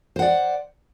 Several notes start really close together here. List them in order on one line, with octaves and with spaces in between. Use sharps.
C5 F#5 D5